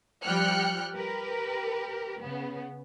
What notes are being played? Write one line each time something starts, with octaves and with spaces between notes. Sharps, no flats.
F3 G3 G5 F6 F#6 C#7
G4 A#4 B4
C#3 B3